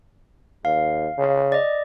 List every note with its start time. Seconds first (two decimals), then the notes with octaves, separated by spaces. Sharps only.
0.65 D#2 F5
1.18 C#3
1.52 D5 D#5